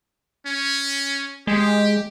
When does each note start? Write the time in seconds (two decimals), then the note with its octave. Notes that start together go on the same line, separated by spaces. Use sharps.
0.46 C#4
1.47 G#3 G4